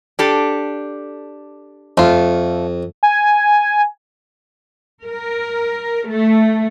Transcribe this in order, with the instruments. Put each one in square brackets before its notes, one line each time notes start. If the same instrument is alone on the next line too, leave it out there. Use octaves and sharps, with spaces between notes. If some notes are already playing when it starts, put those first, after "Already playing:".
[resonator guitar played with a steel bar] D4 G4 A4
[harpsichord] F2 [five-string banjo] A3 F4
[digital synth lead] G#5
[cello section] A#4
A3